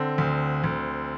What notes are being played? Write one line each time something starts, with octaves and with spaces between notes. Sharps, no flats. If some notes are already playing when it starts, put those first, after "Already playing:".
Already playing: D3 C4
D2
D2